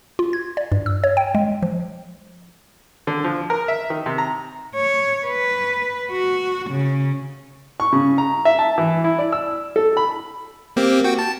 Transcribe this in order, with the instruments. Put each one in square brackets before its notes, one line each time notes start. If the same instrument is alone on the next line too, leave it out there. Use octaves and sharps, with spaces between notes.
[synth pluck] F4
G#6
D5
G2
E6
C#5
G5
G#3
F3
[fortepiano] D3
F3
A#4
E5
D#3
C3
A#5
[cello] C#5
B4
F#4
C#3
[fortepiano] C#6
C#3
A#5
E5
A5
E3
E4
D5
E6
A4
B5
[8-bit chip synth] A#3 C4 G4
F#4 G5
A5